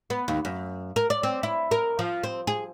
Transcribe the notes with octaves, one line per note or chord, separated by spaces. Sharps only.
B3
D#2
F#2
A#4
D5
C4
E4
A#4
F3
C4
G#4